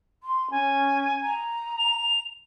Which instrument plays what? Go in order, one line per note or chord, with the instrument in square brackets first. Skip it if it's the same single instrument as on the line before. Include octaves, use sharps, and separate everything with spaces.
[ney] C6
[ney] C#4 [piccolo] G#5
[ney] A#5
[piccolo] F7